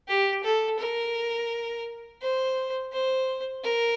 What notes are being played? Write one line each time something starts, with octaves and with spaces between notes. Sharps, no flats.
G4
A4
A#4
C5
C5
A#4